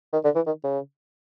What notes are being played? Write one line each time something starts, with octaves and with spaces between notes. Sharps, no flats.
D#3
D3
E3
D#3
C#3